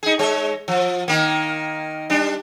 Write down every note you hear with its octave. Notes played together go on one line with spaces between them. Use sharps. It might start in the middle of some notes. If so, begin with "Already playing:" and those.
D#4 G#4
G#3 C#5
F3
D#3 A#3
G3 D4